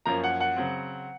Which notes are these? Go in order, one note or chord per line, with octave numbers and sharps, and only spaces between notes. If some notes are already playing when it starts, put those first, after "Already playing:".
F#2 F3 A#3 C#4 A#5
F#5
F#5
C#3 F#3 C4